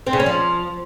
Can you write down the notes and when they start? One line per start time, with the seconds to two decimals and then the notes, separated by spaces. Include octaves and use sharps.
0.07 C4
0.13 C#3
0.20 C#4
0.26 F3